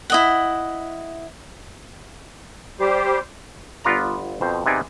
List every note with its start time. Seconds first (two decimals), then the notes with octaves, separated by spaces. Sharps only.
0.10 E4 D#5 F#5
2.80 G3 G4 C5
3.84 G1 B3 F4 D5 A#5
4.41 F2 B2 C5
4.66 C3 B3 D#4 G#4 D5 G#5